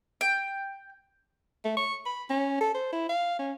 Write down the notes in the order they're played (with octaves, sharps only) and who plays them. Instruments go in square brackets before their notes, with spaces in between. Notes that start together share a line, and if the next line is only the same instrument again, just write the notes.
[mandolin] G5
[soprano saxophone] A3
C#6
B5
C#4
A4
C5
E4
F5
C#4